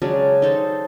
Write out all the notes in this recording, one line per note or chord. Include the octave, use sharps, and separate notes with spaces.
C#3 F#3 G#3 D4
D#4 A4 C5